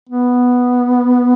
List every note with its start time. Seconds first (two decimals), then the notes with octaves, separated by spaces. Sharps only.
0.09 B3